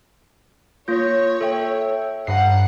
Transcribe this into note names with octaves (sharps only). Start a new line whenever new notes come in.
A#3 F4 C#5 G6 A#6
A4 E5 G5
G2 D#5 F#5 C7